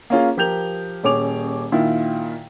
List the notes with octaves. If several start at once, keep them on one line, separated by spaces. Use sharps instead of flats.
A#3 C#4 F4 G#4
F3 G4 A#4 G6 F7
D#1 C#4 G#4 C#5 D6 F7
A#2 D#3 E4 F4